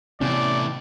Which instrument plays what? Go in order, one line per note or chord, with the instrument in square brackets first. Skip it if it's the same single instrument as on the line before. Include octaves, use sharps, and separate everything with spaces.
[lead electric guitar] A2 E3 [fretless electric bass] C3 B3 C#4 [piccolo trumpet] D5